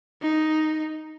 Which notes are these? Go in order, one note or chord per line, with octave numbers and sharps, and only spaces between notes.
D#4